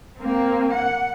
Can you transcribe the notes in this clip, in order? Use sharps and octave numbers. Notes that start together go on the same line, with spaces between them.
A#3 C4
F#5